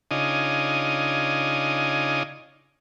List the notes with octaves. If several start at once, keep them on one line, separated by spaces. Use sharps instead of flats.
C#3 D4 D#4 F4 D#5 G#5